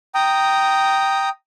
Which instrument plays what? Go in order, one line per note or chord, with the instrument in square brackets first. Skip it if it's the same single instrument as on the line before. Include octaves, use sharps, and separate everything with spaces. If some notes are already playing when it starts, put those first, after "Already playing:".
[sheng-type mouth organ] G5 A#5 D#6